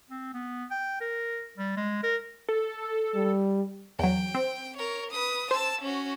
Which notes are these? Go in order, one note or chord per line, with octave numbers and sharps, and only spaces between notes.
C4
B3
G5
A#4
G3
G#3
A#4
A4
G3
E2 F#3 G5
C4
A#4 C#5
B4 D#6
C5 A5 E6
C#4 F#4